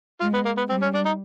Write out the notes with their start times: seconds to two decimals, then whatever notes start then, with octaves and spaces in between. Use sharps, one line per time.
0.21 G#3 F4
0.34 B3
0.45 A#3
0.57 B3
0.69 G3 C4
0.82 C#4
0.94 D4
1.06 D#4